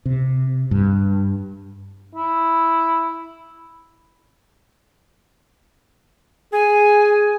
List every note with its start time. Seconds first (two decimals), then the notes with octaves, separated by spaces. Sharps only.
0.05 C3
0.71 G2
2.15 E4
6.53 G#4 G#5